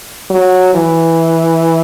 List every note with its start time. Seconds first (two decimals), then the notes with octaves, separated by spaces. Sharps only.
0.30 F#3
0.74 E3